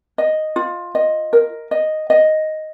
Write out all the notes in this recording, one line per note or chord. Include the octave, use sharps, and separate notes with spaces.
D#5
F4
D#5
A#4
D#5
D#5